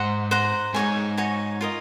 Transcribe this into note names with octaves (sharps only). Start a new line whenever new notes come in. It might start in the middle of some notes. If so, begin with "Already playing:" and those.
Already playing: G#2 C5 F#5 A#5
C5 F#5 A#5
G#2 D#4 F#4 C#5 G#5
D#4 F#4 C#5 G#5
F4 A#4 D#5